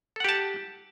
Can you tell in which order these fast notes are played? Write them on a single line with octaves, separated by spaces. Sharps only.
A4 F#5 G4 A5